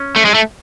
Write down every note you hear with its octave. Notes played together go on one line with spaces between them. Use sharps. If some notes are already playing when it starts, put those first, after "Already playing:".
Already playing: C#4
A3
G#3
A3